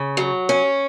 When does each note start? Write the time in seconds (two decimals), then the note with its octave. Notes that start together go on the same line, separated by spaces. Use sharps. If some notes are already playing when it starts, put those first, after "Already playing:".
Already playing: C#3
0.17 F#3
0.49 C#4